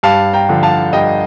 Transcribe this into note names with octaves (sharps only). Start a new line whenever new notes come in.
G2 F5 A5
G5 A#5
D3 F3
F5 A5
G2 D#5 G5